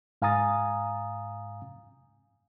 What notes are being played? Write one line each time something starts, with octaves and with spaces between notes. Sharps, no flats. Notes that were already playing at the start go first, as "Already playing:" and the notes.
G#2 F5 G#5 A#5 D#6 A6